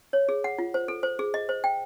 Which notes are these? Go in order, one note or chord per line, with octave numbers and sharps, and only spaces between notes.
C#5
G#4
F#5
F4
C5
A4
C5
G#4
D#5
C5
G5